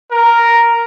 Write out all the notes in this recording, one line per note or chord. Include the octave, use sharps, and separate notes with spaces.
A#4